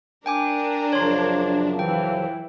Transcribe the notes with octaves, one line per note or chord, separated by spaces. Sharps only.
D4 A#4 G5 G#5 D6
F#2 C#3 F3 C#5 C6
E3 G5